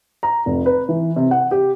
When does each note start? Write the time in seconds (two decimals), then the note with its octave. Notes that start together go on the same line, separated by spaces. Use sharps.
0.23 A#5
0.46 F1
0.66 B4
0.89 E3
1.16 C3
1.31 F#5
1.51 G4